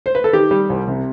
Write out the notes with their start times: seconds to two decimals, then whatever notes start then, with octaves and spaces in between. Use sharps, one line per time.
0.06 C5
0.15 B4
0.24 A4
0.33 D#3 G4
0.51 G3
0.70 C2
0.88 C3